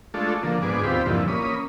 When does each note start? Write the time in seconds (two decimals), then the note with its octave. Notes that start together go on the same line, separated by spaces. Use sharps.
0.14 G#3 A3 D4 F4 A4
0.43 D3 F3 A#3
0.62 G#2 D3 B3 G#4 D6
0.83 D#2 C4 F4 G4 B5
1.06 G2 A#2 D3 E3 F3
1.28 A#3 C#4 B5 D#6